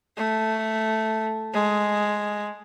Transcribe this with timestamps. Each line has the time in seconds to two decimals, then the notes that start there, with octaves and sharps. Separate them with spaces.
0.17 A3
1.54 G#3